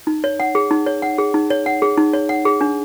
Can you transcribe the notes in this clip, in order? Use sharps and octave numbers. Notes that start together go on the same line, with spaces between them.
D#4
C#5
F#5
G#4
D#4
C#5
F#5
G#4
D#4
C#5
F#5
G#4
D#4
C#5
F#5
G#4
D4